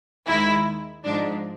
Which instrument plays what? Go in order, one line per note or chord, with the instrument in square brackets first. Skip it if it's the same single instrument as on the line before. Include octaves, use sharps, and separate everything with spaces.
[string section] D#2 D#3 G#3 E4
G#2 F3 G#3 D4